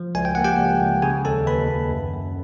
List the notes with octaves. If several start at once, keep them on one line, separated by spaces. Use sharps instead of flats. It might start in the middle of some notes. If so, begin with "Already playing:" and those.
Already playing: F3
C#2 G#5
G5
A#3 F#5
G4 G5
C#2
C#2
C#3 G#4 G#5
D#2 A4 A5
D#2 B4 B5
D#2
F#2
F#2